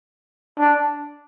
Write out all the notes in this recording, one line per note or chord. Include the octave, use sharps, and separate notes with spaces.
D4